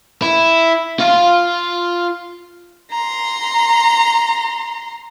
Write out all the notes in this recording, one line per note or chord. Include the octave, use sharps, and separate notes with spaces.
E4
F4 F5
A#5 C6